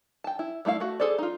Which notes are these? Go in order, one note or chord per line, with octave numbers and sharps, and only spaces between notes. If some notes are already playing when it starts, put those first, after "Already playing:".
G5 A5
E4
G3 A3 E4 F5
A3 F#4
G#4 A4 C5 D5
D#4 F4